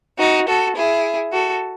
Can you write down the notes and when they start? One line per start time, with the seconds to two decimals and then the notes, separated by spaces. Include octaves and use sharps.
0.19 D#4 F#4
0.47 F#4 A4
0.75 E4 G#4
1.32 F#4 A4